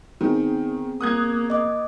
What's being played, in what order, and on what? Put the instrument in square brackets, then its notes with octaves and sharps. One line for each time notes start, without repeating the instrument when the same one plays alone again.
[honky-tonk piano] D#3 [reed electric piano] B3 C4 G#4
[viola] A#3 [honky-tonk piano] D#6 F#6 G#6
[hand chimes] D#5 D6